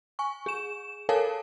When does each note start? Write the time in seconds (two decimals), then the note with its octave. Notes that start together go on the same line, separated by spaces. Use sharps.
0.19 G#5 C#6
0.46 G#4 E7
1.09 A4 A#4 C#5 F5 G#5 A5